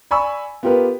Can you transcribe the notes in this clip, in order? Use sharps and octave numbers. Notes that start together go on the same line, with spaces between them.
D5 G#5 B5 C#6 E6
B3 F4 G4 A#4 B4